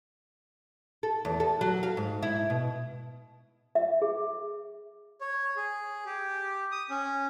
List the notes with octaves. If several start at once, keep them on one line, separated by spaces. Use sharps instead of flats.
A4
E2
A4
F#3
F5
G#2
E4
B2
E5
G#4
C#5
G#4
G4
D#6
C#4